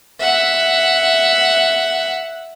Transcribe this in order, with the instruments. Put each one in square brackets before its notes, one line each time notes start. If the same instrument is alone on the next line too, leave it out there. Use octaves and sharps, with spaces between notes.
[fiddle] E5 F#5